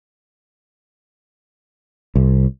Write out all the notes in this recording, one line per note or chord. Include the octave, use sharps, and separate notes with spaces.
C2